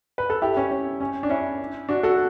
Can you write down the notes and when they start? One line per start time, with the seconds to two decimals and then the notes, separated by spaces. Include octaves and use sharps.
0.18 B4
0.30 A4
0.42 E4 G4
0.57 C#4
0.71 C#4
1.01 C#4
1.23 D4
1.30 C#4 E4
1.89 D4 F#4
2.03 F#4 A4